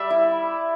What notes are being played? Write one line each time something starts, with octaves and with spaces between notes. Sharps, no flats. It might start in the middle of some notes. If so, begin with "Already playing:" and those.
Already playing: G3 D5 E5
E4